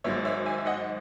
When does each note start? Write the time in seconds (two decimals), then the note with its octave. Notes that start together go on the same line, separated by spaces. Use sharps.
0.04 G#1 G#2 F#3 C#5 E5
0.25 C#5 E5
0.46 E5 G#5
0.58 E5
0.66 D#5 F#5